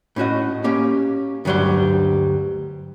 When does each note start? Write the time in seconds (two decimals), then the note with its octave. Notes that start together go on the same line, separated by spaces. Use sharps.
0.16 A2 C#4 F#4 D#5
0.64 A#3 C#4 G4
1.45 D2 G2 F#3 G3 C6